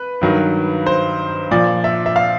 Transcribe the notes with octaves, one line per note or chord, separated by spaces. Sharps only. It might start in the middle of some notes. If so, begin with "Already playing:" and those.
Already playing: B4
G2 D#3 F#3
C5
A#2 F3 D5
E5
E5
F5